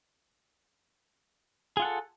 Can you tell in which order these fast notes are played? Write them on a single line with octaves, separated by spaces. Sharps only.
G#4 F4 F#5 A4